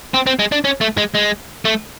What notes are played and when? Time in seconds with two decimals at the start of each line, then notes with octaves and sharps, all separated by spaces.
0.14 C4
0.27 C4
0.39 G#3
0.52 D4
0.65 C#4
0.81 A3
0.97 G#3
1.15 G#3
1.65 A3